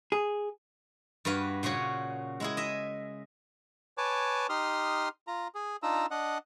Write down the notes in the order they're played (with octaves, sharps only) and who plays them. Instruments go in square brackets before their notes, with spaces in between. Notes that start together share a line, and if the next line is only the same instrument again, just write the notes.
[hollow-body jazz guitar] G#4
[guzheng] G2 F#4 B4 F5
A#2 C#3 C#4 F#4 C#5
G#3 E4 G#4
D#5 E5
[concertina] B4 C#5 G#5 A5 D6
D#4 G4 C6 D#6 F6
F4 A#5
G#4
D4 D#4 F4 A#5 E6
D4 D#5 F#5